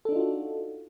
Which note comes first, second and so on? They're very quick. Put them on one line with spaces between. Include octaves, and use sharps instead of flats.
A4 D4 D#4 F4 F#4